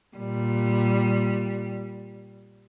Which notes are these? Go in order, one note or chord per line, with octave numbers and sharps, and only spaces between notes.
A#2 G3